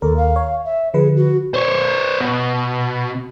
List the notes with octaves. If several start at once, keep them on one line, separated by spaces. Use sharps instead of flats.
D#2 A4 A#4
F5
C#5
E5
D3 F3 G#4 B4
F#4
C5 C#5
B2